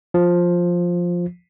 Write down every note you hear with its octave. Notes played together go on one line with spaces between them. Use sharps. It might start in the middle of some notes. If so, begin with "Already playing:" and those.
F3